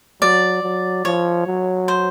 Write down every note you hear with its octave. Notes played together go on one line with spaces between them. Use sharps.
F#3 D5
F#3
F3 C#5
F#3
C5